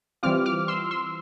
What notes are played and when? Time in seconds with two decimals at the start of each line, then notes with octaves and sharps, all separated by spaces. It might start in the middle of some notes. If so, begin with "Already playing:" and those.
0.23 E3 G3 C4 F4 D6 F6
0.46 D6 F6
0.68 C6 E6
0.91 C6 E6